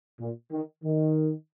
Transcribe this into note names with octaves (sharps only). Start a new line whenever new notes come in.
A#2
D#3
D#3